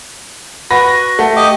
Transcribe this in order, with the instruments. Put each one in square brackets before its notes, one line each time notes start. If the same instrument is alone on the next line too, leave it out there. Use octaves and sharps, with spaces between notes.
[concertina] F#4 [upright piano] B4 A#6
[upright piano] A3
[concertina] G4 D#5 D6